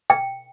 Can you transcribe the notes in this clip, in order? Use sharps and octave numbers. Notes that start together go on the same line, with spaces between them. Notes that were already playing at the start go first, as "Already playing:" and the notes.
G5